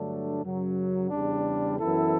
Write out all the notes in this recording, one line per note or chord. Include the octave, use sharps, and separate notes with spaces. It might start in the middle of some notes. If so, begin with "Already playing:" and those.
Already playing: G2 D3 F#3 A3 D4
F#2 C#3 F#3
E2 C#3 G3 D4
F#2 E3 B3 E4 A4